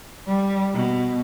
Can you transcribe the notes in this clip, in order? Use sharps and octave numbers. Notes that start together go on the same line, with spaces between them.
G3
B2